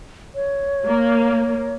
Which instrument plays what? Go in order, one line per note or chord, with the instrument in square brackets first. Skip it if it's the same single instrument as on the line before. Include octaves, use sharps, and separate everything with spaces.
[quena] C#5
[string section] A#3